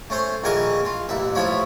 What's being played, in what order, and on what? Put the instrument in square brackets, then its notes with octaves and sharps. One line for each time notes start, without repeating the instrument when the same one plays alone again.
[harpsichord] A3 C#4 C5
A#1 D#3 E3 A#4 G#5 C#6
F4
A1 D#2 E5
A1 A2 F3 C#5 B5